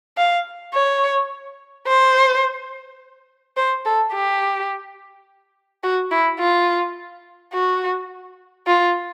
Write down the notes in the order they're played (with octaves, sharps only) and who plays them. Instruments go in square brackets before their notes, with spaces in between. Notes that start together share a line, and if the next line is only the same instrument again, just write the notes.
[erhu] F5
C#5
C5
C5
A4
G4
F#4
E4
F4
F#4
F4